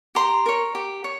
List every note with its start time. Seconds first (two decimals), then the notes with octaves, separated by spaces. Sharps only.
0.15 G4 A#5 C6
0.46 A#4 C#5
0.75 G4
1.04 C#5